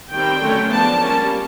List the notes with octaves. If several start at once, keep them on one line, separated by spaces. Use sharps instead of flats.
D#3 G3 C4 G5
D3 F#3 A3 C#4
F3 G#3 B3 D4 A5
G3 A#3 C#4